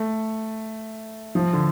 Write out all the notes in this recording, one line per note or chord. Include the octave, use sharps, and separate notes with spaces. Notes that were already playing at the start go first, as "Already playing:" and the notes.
Already playing: A3
F3
D3